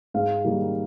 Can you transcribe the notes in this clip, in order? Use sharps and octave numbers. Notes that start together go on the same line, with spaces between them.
G#2 F5
D#3 G3 A#3